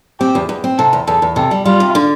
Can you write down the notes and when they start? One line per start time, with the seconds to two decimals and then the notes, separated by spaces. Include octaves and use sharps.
0.20 C4 G4
0.35 E2
0.49 E2
0.64 C4
0.78 C3 A4
0.93 E2
1.07 E2 A4
1.22 E2
1.36 C3 A4
1.51 G3
1.66 G3 F4
1.80 C3
1.95 D3